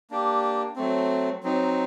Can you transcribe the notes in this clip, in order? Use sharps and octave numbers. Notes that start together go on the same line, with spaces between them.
A#3 D4 G4
F#3 A3 C4
F#3 C4 D#4